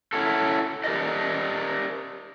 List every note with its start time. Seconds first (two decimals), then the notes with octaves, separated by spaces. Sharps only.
0.13 C#4 E4 F#4 A4
0.84 G4 A#4 D5 D#5